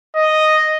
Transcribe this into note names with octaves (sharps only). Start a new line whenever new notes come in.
D#5